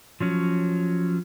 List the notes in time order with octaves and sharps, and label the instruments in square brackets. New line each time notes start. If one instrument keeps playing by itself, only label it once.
[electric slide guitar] F3 F#3 C#4